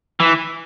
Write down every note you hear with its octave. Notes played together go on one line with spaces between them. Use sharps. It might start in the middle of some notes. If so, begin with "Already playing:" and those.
E3